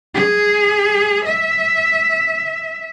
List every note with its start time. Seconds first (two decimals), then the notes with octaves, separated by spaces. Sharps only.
0.14 G#4
1.25 E5